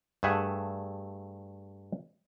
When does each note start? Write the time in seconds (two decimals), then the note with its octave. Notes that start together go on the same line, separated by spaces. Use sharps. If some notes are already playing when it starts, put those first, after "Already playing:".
0.23 G2 A3 G#4 E5 F#5